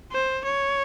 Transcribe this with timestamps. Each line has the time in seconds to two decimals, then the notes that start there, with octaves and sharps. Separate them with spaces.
0.12 C5
0.44 C#5